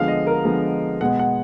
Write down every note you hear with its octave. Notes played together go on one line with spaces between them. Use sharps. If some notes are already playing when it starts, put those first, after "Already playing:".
Already playing: D3 F3 G#3 B3 F5
D#5
A#4
D3 F3 G#3 B3
B2 G#3 B3 F#5
F#5